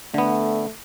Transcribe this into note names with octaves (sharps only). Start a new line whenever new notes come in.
D3 A3 B3